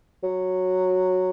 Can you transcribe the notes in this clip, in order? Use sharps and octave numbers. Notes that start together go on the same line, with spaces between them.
F#3